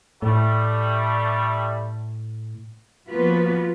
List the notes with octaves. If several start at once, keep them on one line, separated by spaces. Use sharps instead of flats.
A2 G3 A3
F3 A#3 B3 F4 F#4 B4